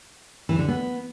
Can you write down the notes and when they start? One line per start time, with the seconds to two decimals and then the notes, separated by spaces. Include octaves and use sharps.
0.49 E3
0.59 D3
0.68 B3